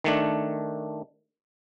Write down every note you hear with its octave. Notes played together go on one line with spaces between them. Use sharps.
D#3 A3 D4